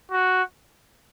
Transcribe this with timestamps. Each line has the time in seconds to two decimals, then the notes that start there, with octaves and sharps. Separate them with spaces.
0.12 F#4